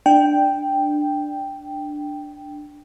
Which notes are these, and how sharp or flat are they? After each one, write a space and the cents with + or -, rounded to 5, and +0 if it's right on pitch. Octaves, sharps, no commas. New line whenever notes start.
D4 +10 G5 +0